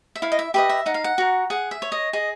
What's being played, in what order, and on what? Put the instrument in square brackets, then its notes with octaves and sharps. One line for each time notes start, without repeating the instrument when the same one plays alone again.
[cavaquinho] E5
E4 F5
D#5
E5
G4 B4 D#5 E5
E5
D#4 F#5
F5
F#5
F#4 A#4
G#4 F#5
E5
C#5
D#5
G#4 D#5